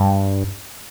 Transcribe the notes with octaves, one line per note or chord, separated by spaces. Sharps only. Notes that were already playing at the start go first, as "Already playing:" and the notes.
Already playing: G2